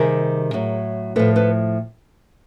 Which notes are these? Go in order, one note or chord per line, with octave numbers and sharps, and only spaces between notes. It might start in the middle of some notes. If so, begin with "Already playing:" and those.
Already playing: C3 D#3 G3 G#4 A#4
A2 F#3
A2 F3 A4 B4
A4 B4